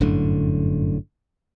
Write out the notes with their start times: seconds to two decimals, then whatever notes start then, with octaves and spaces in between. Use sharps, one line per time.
0.01 G1 F#2 A2 D3